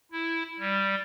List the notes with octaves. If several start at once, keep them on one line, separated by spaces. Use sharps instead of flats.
E4
G3